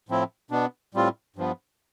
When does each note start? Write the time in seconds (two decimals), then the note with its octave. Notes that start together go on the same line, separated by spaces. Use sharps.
0.09 A2 F3 C4 E4
0.51 B2 B3 D4
0.94 A2 G3 C4 F4
1.36 G2 F3 B3